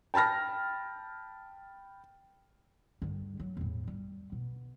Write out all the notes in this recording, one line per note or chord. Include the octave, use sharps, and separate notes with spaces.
G5 A5 B5 F6 A#6
G2 D3
F#3
E2 A2
G3
B2